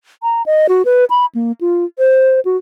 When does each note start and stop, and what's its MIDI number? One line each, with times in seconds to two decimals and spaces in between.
0.23 0.42 82
0.46 0.67 75
0.69 0.82 66
0.85 1.05 71
1.10 1.26 83
1.35 1.52 58
1.61 1.85 65
1.99 2.40 72
2.45 2.57 66